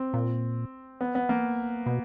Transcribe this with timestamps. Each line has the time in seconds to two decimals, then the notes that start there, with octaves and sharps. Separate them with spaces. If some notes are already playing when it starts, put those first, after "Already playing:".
Already playing: C4
0.14 A#2
1.01 B3
1.15 B3
1.29 A#3
1.86 B2